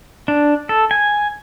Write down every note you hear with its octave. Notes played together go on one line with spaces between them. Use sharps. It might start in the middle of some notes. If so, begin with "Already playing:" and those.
D4
A4
G#5